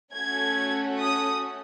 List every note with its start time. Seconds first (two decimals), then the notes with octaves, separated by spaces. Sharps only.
0.14 A3 C#4 F#4 A4 G#6
1.02 D#6